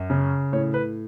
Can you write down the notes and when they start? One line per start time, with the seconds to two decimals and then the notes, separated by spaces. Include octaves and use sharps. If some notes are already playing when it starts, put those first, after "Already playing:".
Already playing: F#2
0.10 C#3
0.52 A2 C#5
0.74 B4